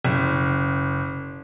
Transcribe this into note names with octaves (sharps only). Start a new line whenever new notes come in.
F#1